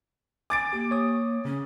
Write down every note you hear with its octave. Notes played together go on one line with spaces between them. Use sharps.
G#5 D6 A6 D7
A#3 G4
C#5 D#6
C#3 C#4